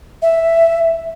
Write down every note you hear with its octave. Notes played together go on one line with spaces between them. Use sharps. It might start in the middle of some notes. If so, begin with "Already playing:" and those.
E5